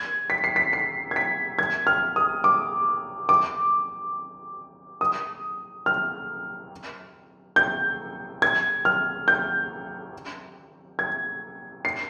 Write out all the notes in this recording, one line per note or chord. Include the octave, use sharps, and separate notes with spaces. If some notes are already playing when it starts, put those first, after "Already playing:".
Already playing: G#6
B6
C7
B6
C7
G#6
B6
G#6
F6
D#6
D6
D6
D#6
F6
G6
G#6
F6
G6
G#6
C7